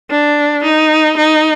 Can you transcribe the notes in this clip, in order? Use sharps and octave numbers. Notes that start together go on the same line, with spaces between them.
D4
D#4
D#4